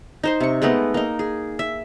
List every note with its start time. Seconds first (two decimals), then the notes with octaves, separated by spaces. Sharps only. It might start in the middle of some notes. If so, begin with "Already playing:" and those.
0.23 D#4 C5 C6
0.40 C3 C#6
0.62 G#3 A3 B3 D#4
0.94 A#3 D#4
1.19 G#4
1.59 E5